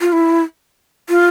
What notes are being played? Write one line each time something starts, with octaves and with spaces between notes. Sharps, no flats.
F4
E4
F4